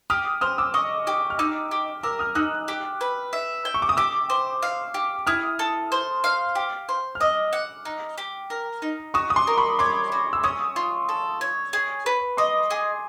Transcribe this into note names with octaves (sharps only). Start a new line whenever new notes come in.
G4 D#6 F6
C5 D#6 F6
D6 E6
D#5 C#6 D#6
G4
F6
D#4 D6 E6
G4
A#4 D6 E6
D#6 F6
D#4 E6 F#6
G4
B4
E5
G5
C#6
D6
D#6
G4 D6 E6
C5
F5
G4
E4 D#6 F6
A4
C5
F5
G4
C5
F6
D#5 D6 E6
F#5
D#4
G4
A#4
D#4
F#4 C#6 D#6
D#6
C6 D6
A#4
B5 C#6
C#5 C6 D6
F#4
E6
C#4 C#6 D#6
F4
A4
C#5
G#4
B4
D#5 C6 D6
G#4